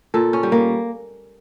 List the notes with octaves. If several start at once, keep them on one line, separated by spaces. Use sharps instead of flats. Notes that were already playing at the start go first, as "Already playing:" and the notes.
A#2 A4
C#4
G3
A#3